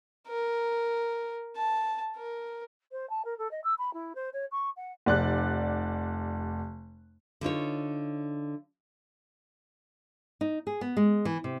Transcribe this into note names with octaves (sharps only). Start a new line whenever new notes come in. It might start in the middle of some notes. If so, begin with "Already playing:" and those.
A#4
A5
A#4
C5
A5
A#4
A4
D#5
E6
B5
E4
C5
C#5
C#6
F#5
F1 D5 F#6
D3 D#4 F4 C#5
D#4
G#4
B3
G#3
E3
C3